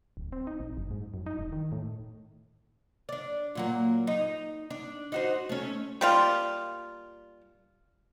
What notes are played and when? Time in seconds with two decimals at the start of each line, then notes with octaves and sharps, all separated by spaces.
0.17 D1
0.32 C4
0.47 D#4
0.60 A#1
0.77 F#1
0.91 G#2
1.14 F#2
1.26 D#4
1.39 E1
1.52 D#3
1.72 A2
3.09 D4 D5
3.55 A#2 F#3 A#3
4.07 D#4
4.70 D4
5.12 D#4 F#4 C5
5.49 A3 C#4
6.01 G3 A#3 F4